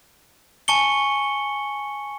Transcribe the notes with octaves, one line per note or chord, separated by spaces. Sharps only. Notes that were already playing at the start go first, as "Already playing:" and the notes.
G#5 A5 C#6 C#7 G7